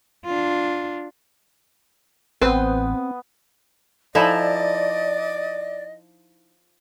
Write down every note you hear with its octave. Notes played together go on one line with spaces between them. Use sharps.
D4 F4
A1 B3 C4 B4 C5 D#6
F3 D#4 E4 A4 D5 D#5 G#5 B5